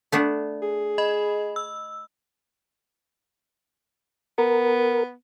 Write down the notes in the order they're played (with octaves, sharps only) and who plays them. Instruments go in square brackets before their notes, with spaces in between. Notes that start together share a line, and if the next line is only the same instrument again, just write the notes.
[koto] A3 B3 D4
[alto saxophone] G#4
[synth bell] D#5 B5
E6
[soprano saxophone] B3 [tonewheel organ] A#4